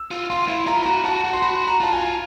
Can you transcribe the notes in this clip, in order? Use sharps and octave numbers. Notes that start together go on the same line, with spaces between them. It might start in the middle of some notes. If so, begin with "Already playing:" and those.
Already playing: E6
F4
F4 C6
E4
F4 A#5
B5
F#4 A#5
F#4 A5
F#4
C6
F#4 B5
A#5
F4 A5
G#5